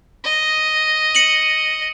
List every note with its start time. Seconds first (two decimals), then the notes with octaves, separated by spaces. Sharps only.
0.24 D#5
1.15 C#7 D#7 F#7